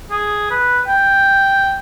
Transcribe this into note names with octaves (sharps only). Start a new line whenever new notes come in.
G#4
B4
G5